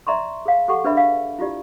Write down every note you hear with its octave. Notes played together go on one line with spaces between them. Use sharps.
D5 E5 A#5 C6 C#6
G#4 A#4 F5 A5
G4 A4 F#5 C#6
D4 G#4 B4 D5 E5 B5
F5
E4 F4 G4 D5